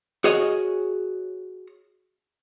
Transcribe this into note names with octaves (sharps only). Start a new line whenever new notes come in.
F#4 G#4 C#5 D#5